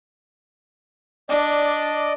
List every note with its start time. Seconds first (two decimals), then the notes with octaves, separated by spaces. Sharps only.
1.29 D4 D5 D#5